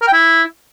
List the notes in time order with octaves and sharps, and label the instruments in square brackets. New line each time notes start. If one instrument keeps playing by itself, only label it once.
[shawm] A#4
G5
E4